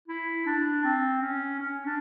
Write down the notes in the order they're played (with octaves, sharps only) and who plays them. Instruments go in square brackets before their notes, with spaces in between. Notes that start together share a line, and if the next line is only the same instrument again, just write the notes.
[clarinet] E4
D4
C4
C#4
C#4
D4